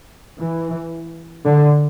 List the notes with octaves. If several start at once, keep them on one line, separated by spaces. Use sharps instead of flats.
E3
D3